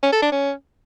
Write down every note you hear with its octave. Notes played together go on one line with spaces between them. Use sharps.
C#4
A4
D4
C#4